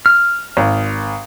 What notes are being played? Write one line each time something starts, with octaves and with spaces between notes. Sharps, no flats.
F6
G#1